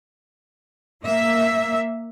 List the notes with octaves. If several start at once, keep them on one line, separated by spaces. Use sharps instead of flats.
A#3 E5